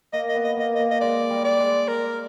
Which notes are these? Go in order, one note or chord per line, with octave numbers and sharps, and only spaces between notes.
A#3 D#5
D#5
B3
D#5
A#3 D#5
D#5
A#3
D#5
G#3 D5
G3
D5
G#3
A#4